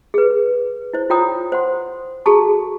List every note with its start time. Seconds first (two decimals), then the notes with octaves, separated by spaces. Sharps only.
0.14 G#4 B4
0.93 E4 C5
1.10 F4 C#5 G5 A#5 D#6
1.52 C5 F#5 C6
2.26 F#4 G#4 A4 A5 A#5 C#6